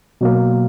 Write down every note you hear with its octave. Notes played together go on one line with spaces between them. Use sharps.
B2 F#3 A#3